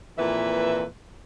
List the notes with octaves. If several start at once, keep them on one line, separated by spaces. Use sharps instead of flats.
F2 A#2 E3 B4 E5